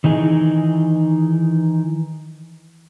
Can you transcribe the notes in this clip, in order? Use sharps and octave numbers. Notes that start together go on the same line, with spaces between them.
D#3 E3 D#4 G#4